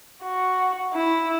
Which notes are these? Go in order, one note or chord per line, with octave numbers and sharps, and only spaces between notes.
F#4
E4